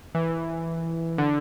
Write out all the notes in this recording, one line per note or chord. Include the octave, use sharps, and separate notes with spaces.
E3
D3